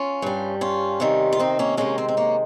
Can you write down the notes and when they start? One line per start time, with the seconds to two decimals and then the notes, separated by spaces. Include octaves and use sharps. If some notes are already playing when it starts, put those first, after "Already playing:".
Already playing: C#4 F4
0.22 G2 G3
0.61 C#4 F4
1.00 C3 D#3 G3
1.33 F4
1.39 C4 D#4
1.59 A#3 C#4
1.77 C3 D#3 G#3 A#3 C#4
1.98 C4
2.08 C4
2.17 A#3 C#4